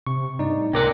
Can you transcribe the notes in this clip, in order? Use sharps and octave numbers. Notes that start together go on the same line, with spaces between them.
C3 C#6
G2 D#4 D5
A2
C#2 C3 A#4 D5 G5 D6 F#6